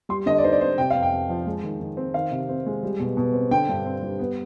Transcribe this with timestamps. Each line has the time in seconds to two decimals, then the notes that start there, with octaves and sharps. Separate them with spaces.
0.09 G3 C6
0.26 D3 D#5
0.38 D5
0.43 D#4 C5
0.52 D5
0.61 C4 C5
0.78 C3 G5
0.90 F2 F5
1.03 G5
1.12 F2
1.29 F3
1.47 G#3
1.64 D#3
1.80 D#3
1.97 C4
2.14 D#3 F5
2.31 C3
2.49 C4
2.66 G#3
2.83 G3
3.00 B2
3.17 B2
3.34 C4
3.51 D3 G5
3.69 G2
3.85 C4
4.02 G3
4.19 B3